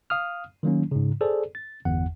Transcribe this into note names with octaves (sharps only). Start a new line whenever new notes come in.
F5 D#6 F6
D#3 F#3 A#3 C#4
G#2 C#3
G#4 A4 C5 D5
A6
G1 E2 F#5